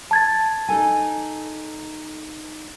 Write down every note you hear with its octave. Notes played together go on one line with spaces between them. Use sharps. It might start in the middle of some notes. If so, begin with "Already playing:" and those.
A5 G#6 A6
D#4 A4 G#5